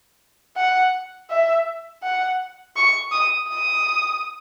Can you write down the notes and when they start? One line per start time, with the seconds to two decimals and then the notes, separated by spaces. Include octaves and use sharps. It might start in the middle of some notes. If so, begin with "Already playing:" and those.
0.57 F#5
1.30 E5
2.03 F#5
2.76 C#6
3.12 D#6
3.49 D#6